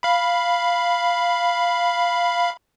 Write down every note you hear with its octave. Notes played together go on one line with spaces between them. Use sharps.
F5 B5